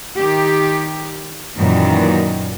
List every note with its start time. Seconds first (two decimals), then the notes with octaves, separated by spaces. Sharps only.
0.18 D#3 G4
1.56 F#2 A#2 D#3 E3